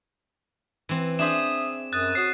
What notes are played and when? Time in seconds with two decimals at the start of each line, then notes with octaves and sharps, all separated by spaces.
0.89 E3 C4
1.19 D4 G#4 C5 E5 D#6 E7
1.93 F#2 D#6 F#6 A6
2.15 F#4 C#5 D#6 C7 E7